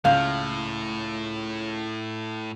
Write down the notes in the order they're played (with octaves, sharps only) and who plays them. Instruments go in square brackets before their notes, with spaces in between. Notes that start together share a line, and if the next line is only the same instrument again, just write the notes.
[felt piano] C#2 G6 [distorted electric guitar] A2 [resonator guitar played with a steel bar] F5